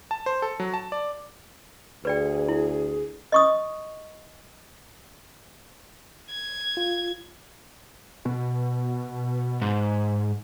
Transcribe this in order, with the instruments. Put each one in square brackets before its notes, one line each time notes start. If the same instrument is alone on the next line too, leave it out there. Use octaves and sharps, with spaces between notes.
[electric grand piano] A5
C5
A4
F#3
A5
D5
[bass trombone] D2 [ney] G#4 [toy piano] B4 D5 G5
[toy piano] E4
D#5 C#6 D#6
[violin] G#6
[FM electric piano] F4
[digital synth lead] B2
[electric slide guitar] G#2